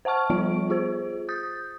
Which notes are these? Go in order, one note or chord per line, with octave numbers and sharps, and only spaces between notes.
C5 F#5 A5 C#6 F6
F3 G3 B3 F4 D7
F4 G#4 C5
D#6 G6 A6